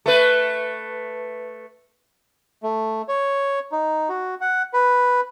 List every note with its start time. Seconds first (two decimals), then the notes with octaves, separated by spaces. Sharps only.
0.06 A3 B4
2.63 A3
3.08 C#5
3.72 D#4
4.09 F#4
4.41 F#5
4.74 B4